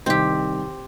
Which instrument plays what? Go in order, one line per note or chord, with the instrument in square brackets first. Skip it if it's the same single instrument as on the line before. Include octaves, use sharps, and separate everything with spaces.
[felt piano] C2 D#3 [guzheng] C4 G4